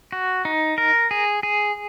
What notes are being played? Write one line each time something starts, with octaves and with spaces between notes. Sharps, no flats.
F#4
D#4
A#4
G#4
G#4